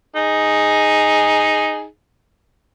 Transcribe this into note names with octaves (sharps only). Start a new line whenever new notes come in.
D#4 G#4